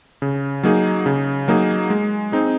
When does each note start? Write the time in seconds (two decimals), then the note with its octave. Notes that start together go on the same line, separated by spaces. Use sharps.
0.22 C#3
0.63 F#3 A#3 D#4 G#4
1.06 C#3
1.48 F#3 A#3 D#4 G#4
1.90 G#3
2.32 C4 D#4 G#4